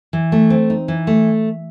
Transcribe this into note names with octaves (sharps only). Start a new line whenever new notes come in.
E3
A3
C4
D#4
E3
A3